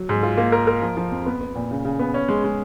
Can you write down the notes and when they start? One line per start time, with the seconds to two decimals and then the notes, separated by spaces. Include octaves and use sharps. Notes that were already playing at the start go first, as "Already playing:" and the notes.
Already playing: F#3
0.09 G#2
0.23 F4
0.37 A#3
0.52 A#4
0.67 A#4
0.81 F3
0.97 F3
1.12 F2
1.26 B3
1.41 B3
1.55 A#2
1.71 C#3
1.85 C#3
1.99 B3
2.14 C#4
2.29 G#3
2.44 G#3